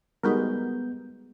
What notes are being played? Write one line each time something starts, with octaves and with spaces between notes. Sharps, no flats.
G3 G#3 B3 D#4 F#4 A#4 B5 G6